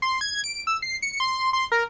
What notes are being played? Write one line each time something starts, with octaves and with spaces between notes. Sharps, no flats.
C6
G#6
D7
E6
C7
C#7
C6
C6
A#4